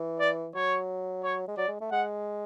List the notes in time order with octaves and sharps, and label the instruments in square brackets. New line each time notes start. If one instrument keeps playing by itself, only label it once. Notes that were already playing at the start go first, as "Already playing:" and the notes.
Already playing: [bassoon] E3
[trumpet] D5
[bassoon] F#3 [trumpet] C#5
[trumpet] C#5
[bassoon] G#3
[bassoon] F#3 [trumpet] D5
[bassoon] G#3
A3
[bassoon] G#3 [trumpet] F#5